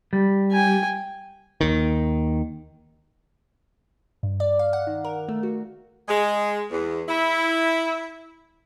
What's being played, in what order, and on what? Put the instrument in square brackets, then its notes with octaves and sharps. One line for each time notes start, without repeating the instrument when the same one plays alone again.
[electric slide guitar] G3
[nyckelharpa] G5 G#5
[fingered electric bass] D#2 D#3
[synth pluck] G2
D5
F5
F#5
D#3
A#4
A3
F#4
[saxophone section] G#3
E2
E4